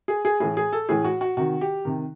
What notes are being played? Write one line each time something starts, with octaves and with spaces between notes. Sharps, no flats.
G#4
G#4
A2 E3 G#4
G#4
A4
A2 E3 G#4
F#4
F#4
C3 D#3 F#4
G4
C3 D#3